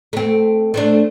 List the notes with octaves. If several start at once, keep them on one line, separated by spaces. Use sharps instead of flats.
A3 C4
A3 C4 D4